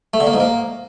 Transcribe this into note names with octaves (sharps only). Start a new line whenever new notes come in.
A3
D3
A#3
G#2
A#3